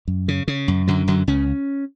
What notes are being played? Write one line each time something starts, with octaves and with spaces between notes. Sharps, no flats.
F#2
C#3
C#3
F#2
F#2 D3 F#3
F#2 D3 F#3
C#2 C#3 C#4